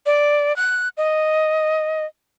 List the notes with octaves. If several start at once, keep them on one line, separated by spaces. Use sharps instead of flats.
D5
F#6
D#5